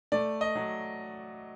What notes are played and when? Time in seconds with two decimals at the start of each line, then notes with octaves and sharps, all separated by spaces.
0.12 A3 D5
0.41 D#5
0.55 F#3